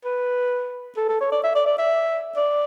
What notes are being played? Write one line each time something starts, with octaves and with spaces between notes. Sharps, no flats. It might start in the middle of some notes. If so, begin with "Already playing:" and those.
B4
A4
A4
C#5
D5
E5
D5
D5
E5
D5